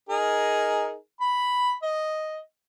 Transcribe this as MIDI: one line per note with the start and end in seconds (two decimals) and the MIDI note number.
0.09 0.94 63
0.09 0.94 68
0.09 0.94 70
1.20 1.73 83
1.82 2.38 75